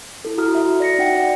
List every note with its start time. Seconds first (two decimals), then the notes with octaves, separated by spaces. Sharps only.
0.25 E4 A4
0.37 E4 F#4 A4 A#5 D#6 F6
0.55 F#4 E5
0.80 D5 A#6 C#7
0.99 D#4 F#4 F#5 G5 C#7
1.15 D5